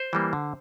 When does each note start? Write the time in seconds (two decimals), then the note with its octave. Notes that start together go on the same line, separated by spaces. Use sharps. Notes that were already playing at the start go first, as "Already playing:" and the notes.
Already playing: C5
0.13 E3 G3 A#3
0.33 D3